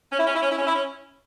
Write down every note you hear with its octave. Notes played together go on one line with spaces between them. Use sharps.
C#4
E4
C#4
E4
C#4
E4
C#4
E4
C#4